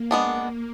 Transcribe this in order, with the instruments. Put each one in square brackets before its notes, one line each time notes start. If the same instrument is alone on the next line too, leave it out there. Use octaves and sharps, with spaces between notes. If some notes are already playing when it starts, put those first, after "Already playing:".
Already playing: [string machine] A#3
[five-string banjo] G#3 B3 D4